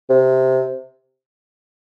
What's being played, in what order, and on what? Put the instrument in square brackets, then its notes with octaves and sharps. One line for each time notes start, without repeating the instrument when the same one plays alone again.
[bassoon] C3